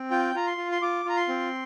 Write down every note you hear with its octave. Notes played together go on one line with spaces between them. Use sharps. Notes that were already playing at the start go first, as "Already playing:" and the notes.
Already playing: C4
F4 G5
F4 A#5
C6
F4
C6
F4 D6
F4 A#5
C6
C4